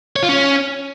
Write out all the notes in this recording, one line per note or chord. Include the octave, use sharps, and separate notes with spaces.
C#5
F4
C#4